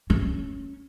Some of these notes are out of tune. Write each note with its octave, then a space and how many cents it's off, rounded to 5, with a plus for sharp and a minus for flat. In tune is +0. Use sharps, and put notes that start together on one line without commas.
C#4 +0